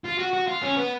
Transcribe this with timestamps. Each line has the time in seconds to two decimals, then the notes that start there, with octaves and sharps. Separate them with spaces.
0.05 F4
0.19 F#4
0.34 F#4
0.48 F4
0.63 C#4
0.77 B3